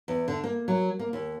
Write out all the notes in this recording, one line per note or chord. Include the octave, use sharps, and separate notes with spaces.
E2
D3
A#3
F#3
A#3
D#2